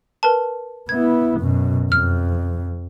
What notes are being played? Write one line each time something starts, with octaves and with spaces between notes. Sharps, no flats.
A#4 B4 A5
B3 E4 G#6
F#2 B2
F2 F6